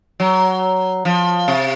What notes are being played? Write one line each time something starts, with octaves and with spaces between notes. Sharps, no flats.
F#3
F3
C3